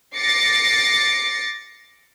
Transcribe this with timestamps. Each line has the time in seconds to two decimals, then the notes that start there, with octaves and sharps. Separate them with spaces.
0.16 D6 A6 A#6 C7 C#7